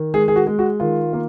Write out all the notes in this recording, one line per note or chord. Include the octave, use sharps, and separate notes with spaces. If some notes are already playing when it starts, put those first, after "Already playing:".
Already playing: D#3
G#3 G#4
G#4
F#4
G#3
F#4
D#3 F4
A#3